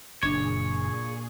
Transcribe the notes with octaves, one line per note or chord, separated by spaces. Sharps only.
F#1 A#2 D4 G#4 C#5 G#6